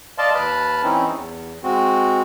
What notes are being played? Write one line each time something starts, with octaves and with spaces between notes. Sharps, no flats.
D5 D#5 F5 A5 C6
D#2 B4 A5 B5 F6 F#6
E3 C4 C#4 D#4 E4
E2
G#3 C4 F#4